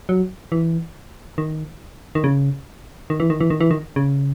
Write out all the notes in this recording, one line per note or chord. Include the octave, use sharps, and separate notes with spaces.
F#3
E3
D#3
D#3
C#3
D#3
E3
D#3
E3
D#3
E3
D#3
C#3